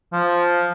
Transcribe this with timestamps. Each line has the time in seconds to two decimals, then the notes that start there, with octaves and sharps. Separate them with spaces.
0.12 F3